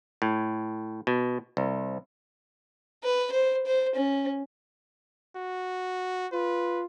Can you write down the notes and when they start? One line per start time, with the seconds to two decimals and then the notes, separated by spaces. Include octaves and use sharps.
0.22 A2
1.07 B2
1.57 C2
3.04 B4
3.32 C5
3.66 C5
3.95 C#4
5.36 F#4
6.32 F4 B4